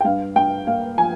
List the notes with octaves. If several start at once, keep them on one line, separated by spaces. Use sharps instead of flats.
G5
G2 F5
G2 G5
A#3 F5
F3 G#5